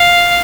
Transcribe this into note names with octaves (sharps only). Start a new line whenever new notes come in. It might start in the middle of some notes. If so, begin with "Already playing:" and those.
Already playing: F5